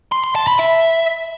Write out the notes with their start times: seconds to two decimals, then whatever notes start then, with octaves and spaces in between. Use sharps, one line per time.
0.12 C6
0.24 C6
0.35 A5
0.47 B5
0.59 E5